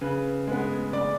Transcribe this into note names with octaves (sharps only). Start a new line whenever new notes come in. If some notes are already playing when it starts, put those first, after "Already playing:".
C#3 B4
G#3 B3
C#3 D5